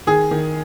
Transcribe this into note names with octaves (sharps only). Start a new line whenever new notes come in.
D#3 G#4
D#3